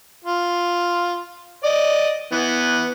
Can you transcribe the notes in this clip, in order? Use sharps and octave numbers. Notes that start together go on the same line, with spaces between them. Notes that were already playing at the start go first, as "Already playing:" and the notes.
F4
D5 D#5
E3 B3